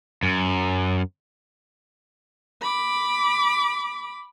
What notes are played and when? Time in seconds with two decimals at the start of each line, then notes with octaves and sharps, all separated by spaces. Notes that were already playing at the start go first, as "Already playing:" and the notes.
0.23 F#2
2.62 B5 D6